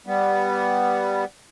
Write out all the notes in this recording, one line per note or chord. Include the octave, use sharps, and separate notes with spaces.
G3 B3